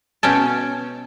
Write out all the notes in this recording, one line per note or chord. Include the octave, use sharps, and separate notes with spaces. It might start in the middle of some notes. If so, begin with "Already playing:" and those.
B2 C#4 G5 A5